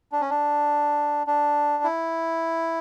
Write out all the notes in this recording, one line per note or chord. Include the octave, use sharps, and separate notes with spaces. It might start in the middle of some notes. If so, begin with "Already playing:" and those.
D4
C#4
D4
D4
E4